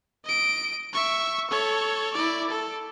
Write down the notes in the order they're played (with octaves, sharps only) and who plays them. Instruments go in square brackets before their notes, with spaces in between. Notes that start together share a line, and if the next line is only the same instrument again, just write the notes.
[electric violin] D#5 D7
E5 C#6
A4 C#5
E4 D5
A4